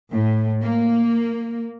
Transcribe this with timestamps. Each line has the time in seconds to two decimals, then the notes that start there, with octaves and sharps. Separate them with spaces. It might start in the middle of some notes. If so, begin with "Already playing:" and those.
0.12 A2
0.62 A#3